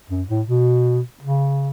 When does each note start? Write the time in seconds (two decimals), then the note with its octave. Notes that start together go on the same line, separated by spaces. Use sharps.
0.09 F#2
0.29 A2
0.47 B2
1.22 C#3